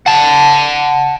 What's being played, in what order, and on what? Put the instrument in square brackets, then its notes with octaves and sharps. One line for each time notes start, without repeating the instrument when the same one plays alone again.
[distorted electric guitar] F#5 A5